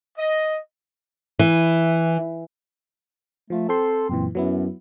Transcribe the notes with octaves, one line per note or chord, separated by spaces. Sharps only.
D#5
E3
F3 A3 F4
C4 A4 G5 C6
F#2 A#2 E3 C4
F#2 F#3 B3 E4